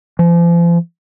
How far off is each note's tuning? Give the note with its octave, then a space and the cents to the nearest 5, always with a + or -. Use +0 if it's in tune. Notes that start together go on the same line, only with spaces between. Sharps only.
F3 -40